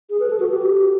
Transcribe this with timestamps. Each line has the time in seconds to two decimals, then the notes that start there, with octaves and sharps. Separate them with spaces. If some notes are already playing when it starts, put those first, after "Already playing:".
0.10 G#4
0.20 B4
0.30 A4
0.40 F#4
0.50 G4